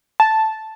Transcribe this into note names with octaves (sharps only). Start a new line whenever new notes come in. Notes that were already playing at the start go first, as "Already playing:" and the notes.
A5